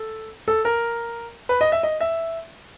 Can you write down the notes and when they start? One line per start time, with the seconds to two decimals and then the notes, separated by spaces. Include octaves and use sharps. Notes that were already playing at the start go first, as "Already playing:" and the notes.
Already playing: A4
0.48 A4
0.65 A#4
1.49 B4
1.61 D#5
1.72 E5
1.83 D#5
2.00 E5